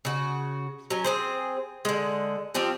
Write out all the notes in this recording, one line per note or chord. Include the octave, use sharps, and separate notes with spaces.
C#3 F#4
F#3 C#4
C4 G#4 C5
D3 G#3
F3 C4 F4 G4